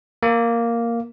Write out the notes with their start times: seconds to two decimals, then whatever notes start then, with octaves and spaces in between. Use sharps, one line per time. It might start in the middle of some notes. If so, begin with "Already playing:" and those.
0.23 A#3